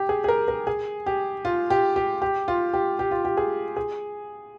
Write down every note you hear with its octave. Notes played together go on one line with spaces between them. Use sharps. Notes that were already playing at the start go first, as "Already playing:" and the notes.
Already playing: G4
G#4
G#4
A#4
A#4
G#4
G4
F4
G4
G4
G4
F4
G4
G4
F4
G4
G#4
G#4